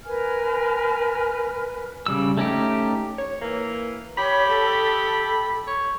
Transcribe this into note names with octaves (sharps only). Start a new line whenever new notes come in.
A#4 B4 G#5 F6
C#3 G3 E6
A3 C#4 D#4 G4
C#5
E3 A#3
G4 C#5 B5
A4
C#5